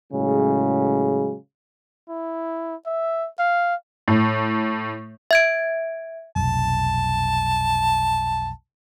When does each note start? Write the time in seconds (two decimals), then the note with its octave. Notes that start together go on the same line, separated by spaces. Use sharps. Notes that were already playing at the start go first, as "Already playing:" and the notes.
0.13 A2 C#3 F#3 G#3
2.09 E4
2.86 E5
3.39 F5
4.08 A2
5.31 E5 G#6 D7
6.36 F1 B1 A5